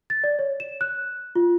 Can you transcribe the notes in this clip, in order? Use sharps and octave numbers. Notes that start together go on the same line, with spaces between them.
A6
D5
C#5
E7
F#6
F4